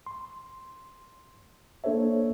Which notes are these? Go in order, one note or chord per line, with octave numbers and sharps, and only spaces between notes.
C6
A#3 D4 A4 C5 C#5 E5